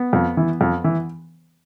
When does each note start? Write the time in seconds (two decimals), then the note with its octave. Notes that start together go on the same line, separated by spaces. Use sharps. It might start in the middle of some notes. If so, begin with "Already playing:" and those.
Already playing: B3
0.13 F2
0.37 E3
0.61 F2
0.84 E3